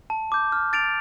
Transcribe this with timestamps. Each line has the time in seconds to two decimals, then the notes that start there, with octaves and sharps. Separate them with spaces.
0.10 A5
0.32 D6 G6
0.52 F6
0.73 A6 D7 F7